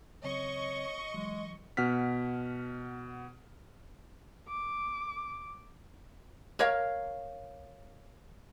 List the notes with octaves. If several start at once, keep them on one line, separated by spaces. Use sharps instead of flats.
C#3 F#3 C4 C#5 D#5 C#6
E3 F#3 G#3
B2 F#5 F6 B6
D6
A#4 C#5 F5